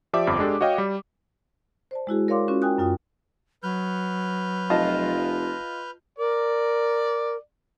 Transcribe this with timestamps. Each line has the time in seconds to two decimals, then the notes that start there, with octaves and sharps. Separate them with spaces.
0.13 F3 G4 D5 E5 D6
0.27 G1 F2
0.39 G#3 D4 G4 A4
0.61 F#4 C#5 D#5 F5 G5
0.78 G3
1.91 C5 D5 A5
2.07 G#3 E4 F#4 G#4
2.28 A#4 C#5 D5 F5 C6 D6
2.48 C#4 F4 F#4 C#6
2.62 F#4 A#4 G5 G#5 D#6 F#6
2.78 F#2 F4 G5 D#6
3.63 F#3 B4 F6 G6
4.70 F1 F4 D#5 A5
6.19 A#4 D5